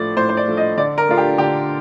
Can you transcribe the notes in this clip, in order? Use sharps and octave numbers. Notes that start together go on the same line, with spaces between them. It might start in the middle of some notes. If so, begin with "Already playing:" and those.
Already playing: A2 F3 A3 D5
A2 C5
C5
D5
F3 A3
D#5
D3 D5
A#4
A3 D4 F4
G4
D3 G4